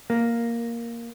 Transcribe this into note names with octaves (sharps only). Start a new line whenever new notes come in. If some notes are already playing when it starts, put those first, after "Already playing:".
A#3